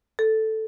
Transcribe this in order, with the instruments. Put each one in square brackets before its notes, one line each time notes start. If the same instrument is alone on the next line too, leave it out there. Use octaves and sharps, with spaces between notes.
[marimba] A4